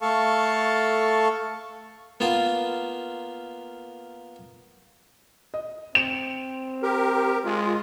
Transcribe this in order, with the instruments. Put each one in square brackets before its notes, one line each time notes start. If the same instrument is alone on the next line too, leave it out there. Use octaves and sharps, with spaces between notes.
[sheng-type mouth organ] A3 A4 F5 A5 C#6
[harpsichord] A#3 B3 F4 A5
[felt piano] D#5
[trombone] C4 [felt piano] C#7 D7 E7
[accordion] G4 A#4
[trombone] G#3 [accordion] F4